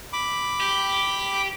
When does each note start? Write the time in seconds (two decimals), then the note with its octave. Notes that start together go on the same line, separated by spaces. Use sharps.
0.13 B5 D6
0.60 G4